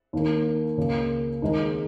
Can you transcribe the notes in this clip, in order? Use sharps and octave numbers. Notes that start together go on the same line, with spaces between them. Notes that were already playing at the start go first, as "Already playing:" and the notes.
D#2 D#3 A#3
C#2 C#3 A#3
D#2 D#3 G#3 D#4 A#4